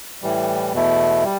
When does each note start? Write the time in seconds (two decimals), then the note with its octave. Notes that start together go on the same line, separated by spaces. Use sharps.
0.22 A2 E3 G3
0.72 E2 B2 A3 E4
1.24 G3